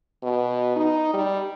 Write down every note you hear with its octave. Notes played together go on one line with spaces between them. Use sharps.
B2
D#4
G3